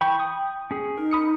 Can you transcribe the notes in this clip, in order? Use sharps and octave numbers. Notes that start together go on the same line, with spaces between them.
E3 G5 B5 C#6
D#6
C#4 G#4
D#4 A#4
B5 D#6 C#7